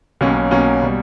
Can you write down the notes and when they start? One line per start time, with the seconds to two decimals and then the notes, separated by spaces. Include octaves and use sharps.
0.21 B1 B2 A#3 C#4
0.51 B1 B2 A#3 C#4
0.82 B2 G3